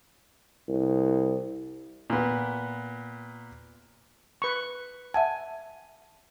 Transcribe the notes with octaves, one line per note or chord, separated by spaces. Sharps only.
C2
A#2 B3
B4 C#6
E5 F#5 G#5 A5